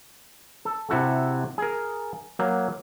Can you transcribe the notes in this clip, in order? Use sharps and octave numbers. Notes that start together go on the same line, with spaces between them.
A4
C3 E4 F#4 A4
G#4 A#4
F#3 A#3